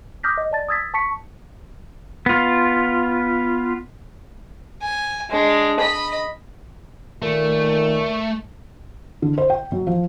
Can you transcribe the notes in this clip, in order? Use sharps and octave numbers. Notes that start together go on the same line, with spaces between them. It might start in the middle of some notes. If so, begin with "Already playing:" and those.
D6 D#6 F6 G6 A#6 B6
D#5
D5 A5 A6
D#6 E6 G#6 A6 B6
A5 C#6 B6 C#7
B3 F4
G#5
G#3 D4
D#5 B5
A#2 D#3 A3
D3
C5
G5
F#3
F3